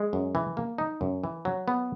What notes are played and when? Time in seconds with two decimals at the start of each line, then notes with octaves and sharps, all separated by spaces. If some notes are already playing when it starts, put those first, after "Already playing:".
Already playing: G#3
0.13 F#2
0.35 E3
0.57 A#3
0.78 D#4
1.01 F#2
1.24 E3
1.45 F#3
1.68 B3